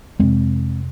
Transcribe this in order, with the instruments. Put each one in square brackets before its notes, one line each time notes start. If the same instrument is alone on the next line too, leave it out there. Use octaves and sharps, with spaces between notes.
[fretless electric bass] F2 C3 G#3 C4